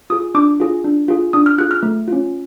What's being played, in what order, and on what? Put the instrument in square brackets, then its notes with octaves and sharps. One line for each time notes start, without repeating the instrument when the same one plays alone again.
[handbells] F4 G#4 D#6
D4 D6
F4 G#4
D4
F4 G#4
D4 D#6
F6
F4 G#4 F#6
F6
A3
C#4 F4